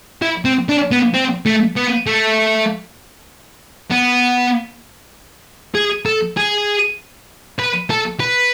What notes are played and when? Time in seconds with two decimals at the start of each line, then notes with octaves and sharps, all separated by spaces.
0.22 E4
0.45 C4
0.69 D4
0.91 B3
1.14 C4
1.46 A3
1.76 B3
2.07 A3
3.91 B3
5.75 G#4
6.06 A4
6.37 G#4
7.60 B4
7.90 A4
8.20 B4